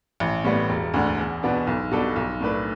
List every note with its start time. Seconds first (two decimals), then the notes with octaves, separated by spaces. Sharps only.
0.20 A1
0.44 A2 G3 B3
0.69 E1
0.94 D2 D3
1.18 E2
1.43 B2 B3 D4
1.67 B1
1.91 B2 G3 D4 A4
2.16 B1
2.41 A2 A3 D4 B4